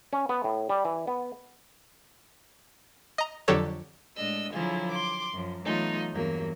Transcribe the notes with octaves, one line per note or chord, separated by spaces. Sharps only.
C#4
B3
A2
G3
E3
B3
D#5 A#5
F2 D3 F#3 G4 A4 C#5
A2 G#3 D4 D#5 E6
D3 F3 F#3 E4 F4 G#4
C6 D6
F#2 F3
E3 F#3 A3 B3 D#4 F4
E2 G2 F#3 A#3